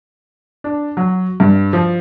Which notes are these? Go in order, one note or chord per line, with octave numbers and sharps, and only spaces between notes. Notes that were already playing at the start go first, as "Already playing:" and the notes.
D4
F#3
G2
F3